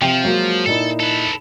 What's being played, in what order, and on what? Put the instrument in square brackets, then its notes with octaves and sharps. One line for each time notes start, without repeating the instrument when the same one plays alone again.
[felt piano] C3 G5 C7 [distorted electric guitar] F3
[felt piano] F#3 G#3 A#3
[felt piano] A#2 D#4 E4 [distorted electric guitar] A4
[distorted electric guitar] A4 B4